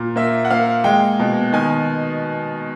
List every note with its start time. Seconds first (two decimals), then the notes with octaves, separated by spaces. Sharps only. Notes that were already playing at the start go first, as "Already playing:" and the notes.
Already playing: A#2
0.16 A#3 E5
0.45 F#5
0.51 A#3 F5
0.84 G#3 G5
1.19 B2
1.53 D#3 G#5